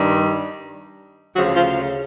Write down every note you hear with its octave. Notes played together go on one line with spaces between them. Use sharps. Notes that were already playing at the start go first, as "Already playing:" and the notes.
Already playing: G2 D#3 G3
D2 C#3 F3 F#3 F#4
F3 F4